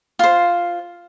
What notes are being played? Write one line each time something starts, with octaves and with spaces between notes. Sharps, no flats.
F4 C5